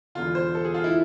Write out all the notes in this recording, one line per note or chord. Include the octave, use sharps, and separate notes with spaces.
E1 E2 D3 F4
C5
A4
G#4
F4
E4